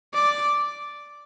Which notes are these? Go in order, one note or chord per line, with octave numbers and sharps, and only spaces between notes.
D5